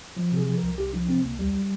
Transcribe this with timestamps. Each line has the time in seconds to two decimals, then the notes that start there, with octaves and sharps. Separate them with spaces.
0.17 F3
0.32 C3
0.37 G#4
0.47 F3
0.58 C2 A#4
0.78 C2 G4
0.93 F3 D4
1.08 C3 C4
1.24 C2 A#3
1.39 D#2 G3